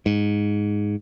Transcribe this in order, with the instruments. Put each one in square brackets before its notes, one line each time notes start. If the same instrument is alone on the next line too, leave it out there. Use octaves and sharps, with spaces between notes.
[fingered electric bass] G#2